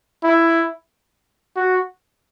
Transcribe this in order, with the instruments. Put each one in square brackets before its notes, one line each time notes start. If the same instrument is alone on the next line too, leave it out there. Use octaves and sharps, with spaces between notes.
[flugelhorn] E4
F#4